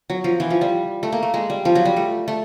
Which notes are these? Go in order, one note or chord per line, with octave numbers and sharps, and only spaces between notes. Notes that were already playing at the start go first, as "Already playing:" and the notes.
F#3
F3
E3
F3
G3
A3
A#3
A3
G#3
G3
F3
F#3
G3
A3
A3